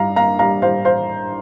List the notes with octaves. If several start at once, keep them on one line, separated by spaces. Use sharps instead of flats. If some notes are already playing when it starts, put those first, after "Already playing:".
Already playing: G2 G3 F5 A#5
A#3 F5 A#5
G3 F5 A#5
G3 C5 F5
C5 F5